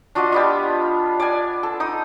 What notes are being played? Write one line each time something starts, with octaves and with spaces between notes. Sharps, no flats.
D4 F4 F#4 D#5
G3 B3 F4
D5 G#5
A4
D#4 D#6